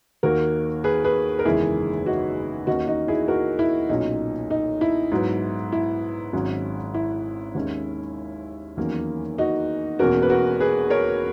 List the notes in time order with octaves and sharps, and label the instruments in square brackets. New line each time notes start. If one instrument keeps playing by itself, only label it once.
[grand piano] D#2 D#3 A#3 F#4 A#4
G#4 B4
G#4 B4
A#4
F#1 E2 D#3 G#3 E4 G#4
D#4 F#4
D#2 D#3 A#3 C#4 D#4 F#4
D#4 F#4
E4 G#4
F#4 A#4
E4
B1 A#2 F#3 C#4 D#4
D#4
E4
G#2 F#3 B3
E4
G#1 G#2 F#3 C#4
E4
D#2 D#3 G#3 C#4
E2 D#3 F#3 A#3 C#4
D#4 F#4
E1 E2 B2 A#3 C#4 F#4 A#4
B4
F#4 A#4
G#4 B4
A#4 C#5